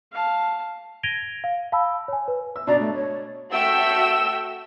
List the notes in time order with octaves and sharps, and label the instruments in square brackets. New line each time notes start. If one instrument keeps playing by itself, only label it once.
[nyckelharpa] F5 A5
[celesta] G#6 A#6 D7 D#7 F7 G7
F5
F5 A5 B5 E6
C#5 G#5
B4
[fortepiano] E6
[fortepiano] B2 D4 A#5 [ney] D5
[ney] A3
C#5
[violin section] A3 F#4 E5 G5 E6